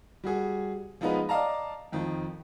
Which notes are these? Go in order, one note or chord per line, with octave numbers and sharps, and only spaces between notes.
G3 F#4 G#4
F3 G#3 B3 D#4 F4 B4
D5 D#5 F5 A5 A#5
F2 D#3 F3